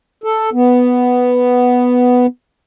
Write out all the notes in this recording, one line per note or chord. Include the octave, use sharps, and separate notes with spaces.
A4
B3